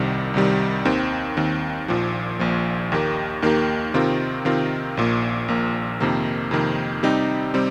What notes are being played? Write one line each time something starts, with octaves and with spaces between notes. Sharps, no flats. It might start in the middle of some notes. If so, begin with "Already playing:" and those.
Already playing: C2 C3 D#3 G3
C2 C3 D#3 G3
D#2 D#3 C4
D#2 D#3 C4
A#1 A#2 F3
A#1 A#2 F3
D#2 D#3 A#3 G4 A#4
D#2 D#3 A#3 G4 A#4
C3 D#3 C4 F4 A#4
C3 D#3 C4 F4 A#4
A#1 A#2 A#3
A#1 A#2 A#3
F2 C3 D#3 A#3
F2 C3 D#3 A#3
C3 G3 C4 D#4 G4
C3 G3 C4